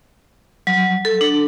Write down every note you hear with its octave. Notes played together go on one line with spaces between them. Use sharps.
F#3
A4
D4